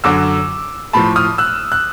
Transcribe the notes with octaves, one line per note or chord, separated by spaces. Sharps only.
F#2 D3 F#3 D6 E6
A2 F3 A5 B5
D#6 F6
E6 F#6
F#6